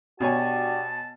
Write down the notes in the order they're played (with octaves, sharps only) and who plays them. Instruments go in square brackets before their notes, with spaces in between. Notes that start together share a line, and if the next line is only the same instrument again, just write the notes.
[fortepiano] B2 C#5 G#5 [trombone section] D4 F#4 G4 [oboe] A5